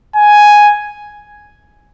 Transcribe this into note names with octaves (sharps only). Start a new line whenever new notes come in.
G#5